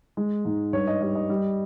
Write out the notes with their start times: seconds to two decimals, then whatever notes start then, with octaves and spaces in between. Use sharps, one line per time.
0.17 G#3
0.45 G#2
0.73 G2 C#5
0.87 D#5
1.01 G3 D#5
1.15 D#5
1.30 G3